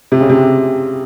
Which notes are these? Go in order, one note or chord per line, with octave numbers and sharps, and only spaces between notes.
C3
C#3
C3